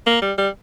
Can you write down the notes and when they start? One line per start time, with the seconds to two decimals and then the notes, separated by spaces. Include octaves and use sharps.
0.06 A#3
0.22 G3
0.38 G3